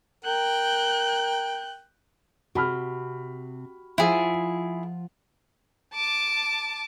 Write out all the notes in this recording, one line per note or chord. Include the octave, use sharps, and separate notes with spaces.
A#4 G5 F#6 G6
C3 F#4 B5 F6
F3 E4 F4 G#4 F#5
A5 D6